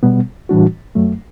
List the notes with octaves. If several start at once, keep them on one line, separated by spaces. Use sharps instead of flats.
B2 G3 B3
A2 E3 G3 D4 F#4
F#2 F#3 A3